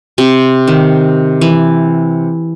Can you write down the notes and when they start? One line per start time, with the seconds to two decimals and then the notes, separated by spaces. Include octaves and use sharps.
0.18 C3
0.67 D#3
1.41 E3